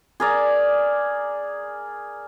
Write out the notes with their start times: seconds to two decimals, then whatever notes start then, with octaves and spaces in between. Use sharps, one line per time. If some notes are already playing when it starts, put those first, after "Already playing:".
0.20 G#4 A#4 D5